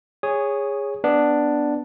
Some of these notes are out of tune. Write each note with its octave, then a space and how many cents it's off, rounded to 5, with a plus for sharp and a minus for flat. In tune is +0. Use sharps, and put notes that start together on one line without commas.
G#4 -15 C#5 +0 D#6 +0
B3 +0 D4 +5